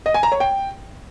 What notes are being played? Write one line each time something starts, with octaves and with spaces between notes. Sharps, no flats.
D#5
G#5
A#5
C#5
G5